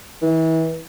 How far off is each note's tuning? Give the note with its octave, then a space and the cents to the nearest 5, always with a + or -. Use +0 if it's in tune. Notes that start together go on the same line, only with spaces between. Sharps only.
E3 -30